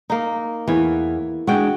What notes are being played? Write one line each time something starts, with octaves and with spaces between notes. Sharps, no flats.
A#3 D#4
E2 E3 C#5
G#3 D4 F#4 G5